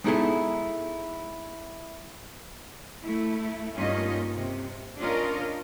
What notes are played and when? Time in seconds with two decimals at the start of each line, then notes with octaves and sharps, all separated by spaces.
0.04 G#3 B3 D#4 E4 G#4 A4
3.02 A3 E4
3.76 G2 A#3 C#4 D#4 F4 D#5
4.33 C3
4.99 C#4 D4 F4 A#4 D#5